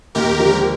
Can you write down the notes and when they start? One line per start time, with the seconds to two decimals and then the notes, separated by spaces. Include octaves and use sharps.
0.15 D#2 G4 A#4
0.38 D3 F3 G#3